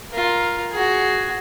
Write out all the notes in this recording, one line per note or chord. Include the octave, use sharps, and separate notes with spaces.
F4 A#4
F#4 G#4